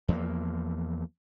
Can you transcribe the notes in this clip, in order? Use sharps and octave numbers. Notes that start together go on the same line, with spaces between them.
E2 F3 G#3 A#3